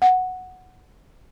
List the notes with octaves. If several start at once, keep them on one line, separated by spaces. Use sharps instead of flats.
F#5